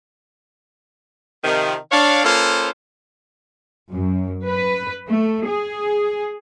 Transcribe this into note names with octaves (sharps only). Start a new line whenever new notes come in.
C3 D#3 F3
D4 C#5 F5
A#3 C#4 F4 A4 B4 C5
F#2
B4
A3
G#4